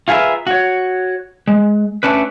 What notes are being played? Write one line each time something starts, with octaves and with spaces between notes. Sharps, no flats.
F4 G#4 A#4 B4 E5
F#4 C#5
G#3
A3 C#4 D4 B4